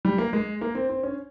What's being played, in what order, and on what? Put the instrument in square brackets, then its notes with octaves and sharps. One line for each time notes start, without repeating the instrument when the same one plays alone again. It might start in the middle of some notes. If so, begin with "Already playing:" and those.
[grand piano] G3
A#3
G#3
A#3
C4
C4
C#4